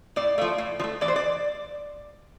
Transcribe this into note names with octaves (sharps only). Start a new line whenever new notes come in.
A2 D5
F3 A3
A2
F3
A3
E3 D5
C5
D5